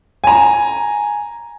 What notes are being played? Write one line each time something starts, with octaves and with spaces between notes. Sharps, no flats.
G#5 A#5